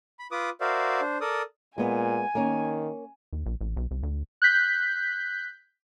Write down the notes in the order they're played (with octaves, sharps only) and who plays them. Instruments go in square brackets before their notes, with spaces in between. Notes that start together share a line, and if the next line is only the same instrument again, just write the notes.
[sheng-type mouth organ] B5
F4 B4 D6 D#6
F#4 A#4 C5 D5 E5 F5
D4 C5
A4 A#4 D5 D#6
[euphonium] A#2 [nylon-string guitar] G#3 B3 [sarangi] G#5
[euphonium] D#3 [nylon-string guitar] A#3 C#4
[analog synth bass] D#2
A#1
A1
B1
C2
D2
[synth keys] F#6 G6 B6